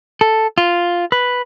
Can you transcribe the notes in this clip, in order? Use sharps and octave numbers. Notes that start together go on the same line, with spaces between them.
A4
F4
B4